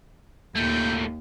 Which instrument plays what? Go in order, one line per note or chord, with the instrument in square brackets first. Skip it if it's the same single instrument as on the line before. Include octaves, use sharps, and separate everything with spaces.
[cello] D#2 [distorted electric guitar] A#2 A3 [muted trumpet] G5